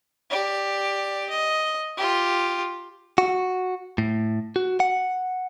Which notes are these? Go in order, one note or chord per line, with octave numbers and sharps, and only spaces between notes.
G4 D5
D#5
F4 G4
F#4
A2
F#4
F#5